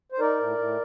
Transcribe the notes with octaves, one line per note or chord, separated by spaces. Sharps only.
C5
D#4 A#4 D5
A2
A2